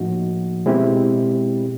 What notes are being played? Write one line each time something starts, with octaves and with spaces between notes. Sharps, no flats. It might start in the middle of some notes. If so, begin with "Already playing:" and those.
Already playing: A2 F3 A#3 D#4 F#4
B2 G#3 C4 E4 G4